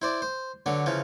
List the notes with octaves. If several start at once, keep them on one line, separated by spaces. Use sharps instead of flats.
E4 C5 D5
C5
D3 F#3 D4 B4
C#3 F3 E4 B4